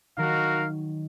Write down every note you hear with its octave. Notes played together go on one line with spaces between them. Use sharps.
D#3 F#3 F#4 A#4 F5